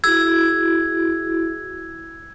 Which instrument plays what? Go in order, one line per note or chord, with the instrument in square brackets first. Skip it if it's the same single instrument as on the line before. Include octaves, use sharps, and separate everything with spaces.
[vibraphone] E4 F#4 G#4 [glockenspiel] E6 G#6